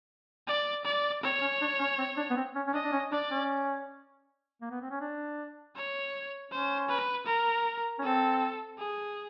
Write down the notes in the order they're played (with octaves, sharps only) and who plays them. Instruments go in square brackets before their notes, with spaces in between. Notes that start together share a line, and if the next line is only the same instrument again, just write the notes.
[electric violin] D5
D5
[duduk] C4 [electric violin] C#5
[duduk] C#4
D4
C#4
C4
D4
B3
C4
C#4
C#4
[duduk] D4 [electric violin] D#5
[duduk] D4
C#4
[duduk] D4 [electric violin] D5
[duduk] C#4
A#3
B3
C4
C#4
D4
[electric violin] C#5
[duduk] C#4 [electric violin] C5
[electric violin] B4
A#4
[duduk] C#4
[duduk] C4 [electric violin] A4
[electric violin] G#4